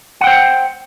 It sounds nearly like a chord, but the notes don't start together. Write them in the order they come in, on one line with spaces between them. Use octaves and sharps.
F#5 G5 C5